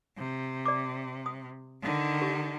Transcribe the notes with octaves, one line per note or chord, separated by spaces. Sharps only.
C3
D5 D6
D#6
D3 D#3
G4